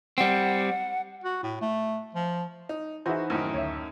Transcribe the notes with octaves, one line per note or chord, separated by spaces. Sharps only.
G3 C4 F#5
F#4
A2
A3
F3
D#4
E3 D#4 E4 F#4 G#4 C5 E5
F#2 A2 D#3
D2 C#5 E5